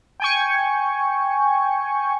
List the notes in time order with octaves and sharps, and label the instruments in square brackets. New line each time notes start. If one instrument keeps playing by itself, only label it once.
[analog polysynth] G5 G#5 C#6